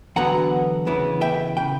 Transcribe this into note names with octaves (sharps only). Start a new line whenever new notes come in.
E2 D3 F#3 B3 F#5 A#5
C#3 E3 B3 E4
E5 G5
C#3 G5